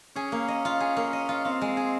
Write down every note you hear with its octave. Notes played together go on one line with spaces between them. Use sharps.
C#4 G#4
A#3
D#5
F4
G#4
A#3
D#5
F4
C4 F4
G#3
G#4